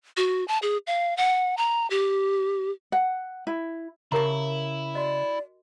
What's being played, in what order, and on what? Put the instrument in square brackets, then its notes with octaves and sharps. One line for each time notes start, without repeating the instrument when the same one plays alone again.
[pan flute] F#4
A5
G#4
F5
F#5
A#5
G4
[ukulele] F#5
E4
[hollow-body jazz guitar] C#3 A5 [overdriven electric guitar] E4 [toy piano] G4 A#4 A#5
[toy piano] F#4 D#5 [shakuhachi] D5